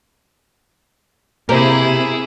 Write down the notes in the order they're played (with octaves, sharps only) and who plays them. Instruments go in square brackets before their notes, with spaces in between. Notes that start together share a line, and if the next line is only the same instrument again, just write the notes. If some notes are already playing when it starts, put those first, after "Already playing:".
[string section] C3 [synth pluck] A#3 G4 C5 [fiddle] E4 G#4 [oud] A#4